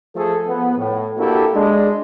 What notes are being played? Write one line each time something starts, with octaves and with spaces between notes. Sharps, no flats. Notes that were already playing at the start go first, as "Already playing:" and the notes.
F3 A3 G#4 A4
F3 B3
A2
A#3 D4 E4 F#4 G4 A4
G#3 D4